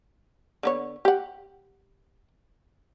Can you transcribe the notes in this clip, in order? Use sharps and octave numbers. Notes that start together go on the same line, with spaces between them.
D3 B3 C#5
G4 F#5